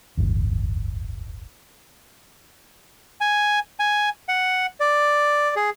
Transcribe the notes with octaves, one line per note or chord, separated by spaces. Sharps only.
D1 G1 E2
G#5
G#5
F#5
D5
G#4